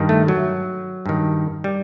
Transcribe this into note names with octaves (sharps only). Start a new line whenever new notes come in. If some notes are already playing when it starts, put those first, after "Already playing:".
Already playing: G2 D#3
A3
F#3
G2 D#3
G3